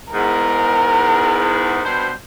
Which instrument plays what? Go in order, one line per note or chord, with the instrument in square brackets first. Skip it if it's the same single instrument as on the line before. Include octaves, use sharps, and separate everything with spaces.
[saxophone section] E2 G#2 [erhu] A#4
[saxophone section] G2 B2 C5